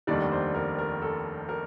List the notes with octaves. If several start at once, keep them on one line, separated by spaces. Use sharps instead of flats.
F1 D#2 D#3 G3 D4 D5
C5
A#4
A#4
A4
A#4